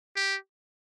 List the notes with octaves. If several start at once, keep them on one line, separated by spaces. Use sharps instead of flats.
G4